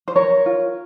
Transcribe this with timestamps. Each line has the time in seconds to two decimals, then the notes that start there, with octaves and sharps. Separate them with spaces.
0.08 C5
0.16 A#4 C#5
0.46 F4